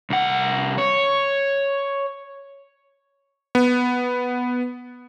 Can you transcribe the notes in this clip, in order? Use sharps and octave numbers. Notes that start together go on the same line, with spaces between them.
C2 F#5
C#5
B3